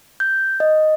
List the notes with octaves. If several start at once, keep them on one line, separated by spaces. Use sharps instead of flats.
G6
D#5